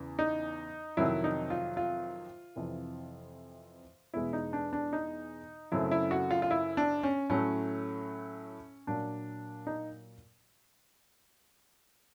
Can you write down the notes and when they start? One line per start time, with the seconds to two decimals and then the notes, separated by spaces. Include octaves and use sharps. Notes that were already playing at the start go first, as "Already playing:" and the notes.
Already playing: E2 C#3
0.19 D#4
0.97 F2 C3 D#3 F#3 E4
1.24 D#4
1.50 F4
1.77 F4
2.56 F2 C3 E3
4.14 E2 B2 G#3 E4
4.33 D#4
4.53 D4
4.73 D4
4.93 D#4
5.72 F#2 C#3 F#3 A3 C4 E4
5.91 E4
6.11 F#4
6.31 F4
6.42 F4
6.51 E4
6.77 D4
7.03 C#4
7.29 A2 F#3 A3 C#4
8.87 A#2 F#3 A#3 D4
9.67 D#4